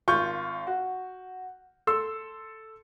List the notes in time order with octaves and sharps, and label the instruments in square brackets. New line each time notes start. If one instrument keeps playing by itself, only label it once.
[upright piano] G#1 F4 C#6 G6
F#4
A4 C6 E6